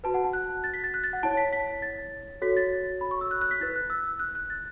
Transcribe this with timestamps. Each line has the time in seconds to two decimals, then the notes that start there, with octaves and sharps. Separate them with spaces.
0.04 F#4 B4 A5
0.14 F#5
0.24 A5
0.33 F#6
0.64 A6
0.74 B6
0.84 A6
0.94 F#6
1.04 A6
1.13 F#5
1.23 E4 C#5 A5
1.37 B6
1.53 B6
1.82 A6
2.42 F#4 A4 C#5 B6
2.57 A6
3.01 B5
3.11 C#6
3.21 E6
3.31 F#6
3.41 F#6
3.51 B6
3.60 E4 B4 A6
3.76 F#6
3.90 E6
4.19 F#6
4.35 F#6
4.50 A6